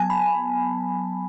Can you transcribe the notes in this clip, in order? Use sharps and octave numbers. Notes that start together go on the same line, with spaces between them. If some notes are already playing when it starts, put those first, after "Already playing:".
Already playing: F#3 B3 G#5 A5
B5